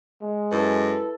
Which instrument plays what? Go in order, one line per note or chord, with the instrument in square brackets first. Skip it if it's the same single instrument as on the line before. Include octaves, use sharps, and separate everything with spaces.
[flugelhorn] G#3
[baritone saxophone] F#2 [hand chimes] E4 B4 [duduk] A4